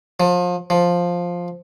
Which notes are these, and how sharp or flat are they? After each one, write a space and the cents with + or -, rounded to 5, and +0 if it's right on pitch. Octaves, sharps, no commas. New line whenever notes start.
F3 +30
F3 +5